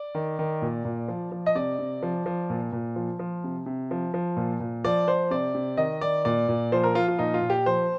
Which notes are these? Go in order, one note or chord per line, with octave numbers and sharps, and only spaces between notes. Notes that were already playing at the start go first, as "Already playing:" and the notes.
Already playing: D5
D#3
D#3
A#2
A#2
F3
F3
D#5
C3 D5
C3
F3
F3
A#2
A#2
F3
F3
C3
C3
F3
F3
A#2
A#2
F3 D5
F3 C5
C3 D5
C3
D#3 D#5
D#3 D5
A#2 D5
A#2
F3 C5
A#4
F3 F4
F4
A#2 D#4
F4
A#2
G4
F3 C5